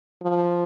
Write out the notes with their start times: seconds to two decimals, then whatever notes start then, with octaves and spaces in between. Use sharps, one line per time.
0.23 F3